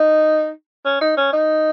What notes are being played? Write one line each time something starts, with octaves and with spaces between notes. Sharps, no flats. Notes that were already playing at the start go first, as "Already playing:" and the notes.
Already playing: D#4
C#4
D#4
C#4
D#4